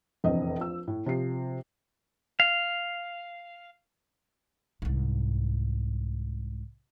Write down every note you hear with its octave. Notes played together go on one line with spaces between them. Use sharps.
F1 A#1 E2 C4 D#5
F3 E6
A2
C3 F3 C7
F5
C2 G#2